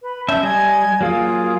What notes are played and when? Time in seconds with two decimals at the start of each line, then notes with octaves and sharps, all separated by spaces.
0.02 B4
0.28 C#4 E5 A5 C6 G6
0.43 G3 D#5 G#5 G#6
1.01 F#3 A#3 F4 G#4 F5